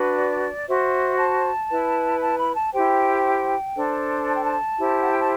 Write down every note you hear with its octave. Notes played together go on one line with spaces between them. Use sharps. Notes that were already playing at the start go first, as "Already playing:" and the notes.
Already playing: D4 F#4 B4
D5
F#4 C5 E5
A5
E4 B4
A5
B5
A5
E4 G4 C5 G5
D4 A4 C5
A5
G5
A5
E4 G4 C5
F#5
G5
A5